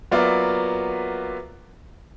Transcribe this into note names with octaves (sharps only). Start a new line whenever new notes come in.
F#3 A#3 B3 F4 D5 E5